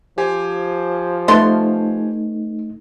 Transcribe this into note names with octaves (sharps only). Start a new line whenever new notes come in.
F3 G4 C5 G#5
A3 B3 D#4 A4 C6